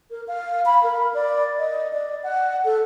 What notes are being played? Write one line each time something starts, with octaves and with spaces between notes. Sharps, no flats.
A#4
F5
B5
A#4
D5
D#5
D5
F#5
A4